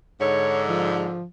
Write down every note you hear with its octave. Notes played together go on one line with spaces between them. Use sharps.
G#2 D3 C#5
F3